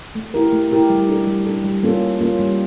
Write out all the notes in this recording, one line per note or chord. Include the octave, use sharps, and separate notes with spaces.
A3
E4 G4 A#4
A3
E4 G4 A#4
G3
D4 A4
G3
D4 A4
G3
A#3 C#4 F4 A4
G3
A#3 C#4 F4 A4
G3